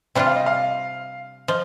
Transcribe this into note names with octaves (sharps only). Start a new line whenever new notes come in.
C3 G3 D4 F4 G5
F5
D#5
F5
F3 D#5